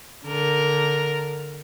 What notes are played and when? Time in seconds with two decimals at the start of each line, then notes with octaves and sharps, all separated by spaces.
0.24 D3 A#4